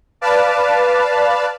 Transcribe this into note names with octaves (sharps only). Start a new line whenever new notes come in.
B4 D5 F5 A5